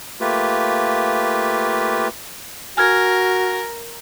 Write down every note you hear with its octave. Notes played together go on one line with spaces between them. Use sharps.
A3 A#3 F4 G4 B4
F#4 A#4 G#5 F6 G#6